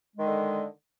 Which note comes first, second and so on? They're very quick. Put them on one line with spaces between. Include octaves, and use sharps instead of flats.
G#3 D#3 D3